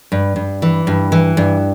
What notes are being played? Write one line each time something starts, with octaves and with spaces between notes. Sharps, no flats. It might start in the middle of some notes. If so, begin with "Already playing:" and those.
G2
G2
E3
G2
E3
G2